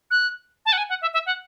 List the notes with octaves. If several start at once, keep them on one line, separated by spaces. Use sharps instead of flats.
F#6
A5
F#5
G#5
F#5
E5
E5
F#5